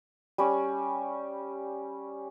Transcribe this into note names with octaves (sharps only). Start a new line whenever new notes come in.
G3 C#4